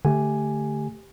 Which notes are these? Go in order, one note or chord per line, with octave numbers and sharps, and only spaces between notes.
D3 A3 G4 G#5